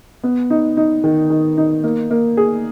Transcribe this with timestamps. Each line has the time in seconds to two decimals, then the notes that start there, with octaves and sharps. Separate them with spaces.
0.24 B3
0.50 D#4
0.77 D#4
1.04 D#3
1.30 D#3
1.58 D#4
1.84 A#3
2.11 A#3
2.37 G#4